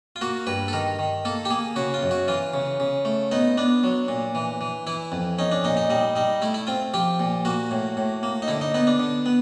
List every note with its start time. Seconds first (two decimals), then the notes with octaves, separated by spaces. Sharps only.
0.16 F4
0.21 A#3 F#4
0.47 G2 B4
0.68 A4
0.73 D#3 A#4
0.99 D#3
1.25 A#3 A4
1.45 G4
1.50 A#3 G#4
1.76 C#3 F#4
1.94 F4
2.03 F#2
2.11 F#4
2.28 E3 F4
2.54 C#3
2.80 C#3
3.05 A3
3.31 B3 D#4
3.58 B3 D4
3.83 F#3
4.08 A#2
4.35 E3
4.61 E3
4.87 E3 E4
5.12 F2
5.38 C#4 D#4
5.52 D4
5.64 A#2 D#4
5.77 D#4
5.90 G3 D#4
6.15 G3 D#4
6.42 A3 E4
6.54 E4
6.67 C4 F4
6.94 F3 G4
7.19 A#2
7.45 A#3 F#4
7.71 A2
7.97 A2
8.23 A#3
8.42 D#4
8.48 D3 E4
8.61 D#4
8.74 B3 D#4
8.87 D4
9.00 D3
9.26 B3